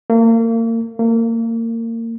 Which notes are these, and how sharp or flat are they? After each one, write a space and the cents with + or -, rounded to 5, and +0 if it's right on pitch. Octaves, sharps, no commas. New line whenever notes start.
A#3 -35
A#3 -30